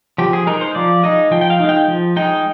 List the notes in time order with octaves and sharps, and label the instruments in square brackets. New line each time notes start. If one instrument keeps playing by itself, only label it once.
[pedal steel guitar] F3 G4
G#4
G#3 D#4 A#4
C5
F3 D5
G#3 D#4 D#5
F3 G5
G5
F5
G#3 D#4
G5
F3
G#3 D#4 G5